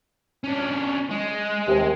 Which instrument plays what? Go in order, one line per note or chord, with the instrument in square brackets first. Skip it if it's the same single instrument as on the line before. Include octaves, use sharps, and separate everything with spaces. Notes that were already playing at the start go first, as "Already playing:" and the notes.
[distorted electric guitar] C#4 D4
G#3
[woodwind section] D#2 C3